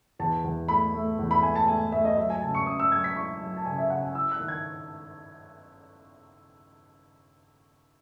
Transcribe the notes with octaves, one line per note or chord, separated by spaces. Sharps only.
E2 A5
E2
A3 B5
A3
E2
B5
A3 G#5
A5
A3 G#5
A3 E5
D#5
F#3 E5
G#5
C#3 A5
C#6
C#4 D#6
E6
F#3 G#6
B6
E4 C#6
F#3
A5
C#3 G#5
E5
C#3 F#5
G#5
E4 E6
F#6
D#3
G#6